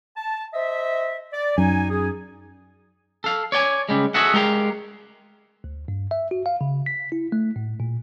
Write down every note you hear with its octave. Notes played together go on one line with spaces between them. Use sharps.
A5
C5 D#5 E5
D5
F#2 D#4 G#5
C#4 D#4 G#4
A4 F5
C#5 D5 G5 G#5
C#3 G3 G#3
F#4 G#4 A4 D#5 E5 F#5
G#3 G4 A#4 F5
D2
G2
E5
F#4
F5
C#3
B6
E4
A3
A2
A#2